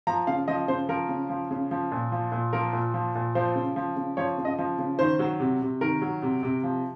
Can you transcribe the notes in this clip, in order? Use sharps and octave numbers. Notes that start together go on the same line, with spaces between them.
F3 A#5
C#3 F5
F3 D#5
C#3 C5
F3 A#4
C#3
F3
C#3
F3
A#2
F3
A#2
F3 A#4
A#2
F3
A#2
F3 C5
C#3
F3
C#3
F3 C#5
C#3
D#5
F3
C#3
D#3 C5
F#3
C3
C3
D#3 A#4
F#3
C3
C3
F3